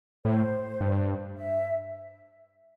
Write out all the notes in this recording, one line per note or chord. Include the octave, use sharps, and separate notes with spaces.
A2 C5
G2
E5